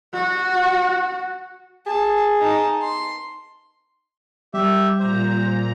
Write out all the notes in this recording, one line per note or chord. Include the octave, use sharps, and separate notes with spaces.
F#4
G#4 A5
D#4 A5
C6
G3 G4 E5
A#2 C5 A#5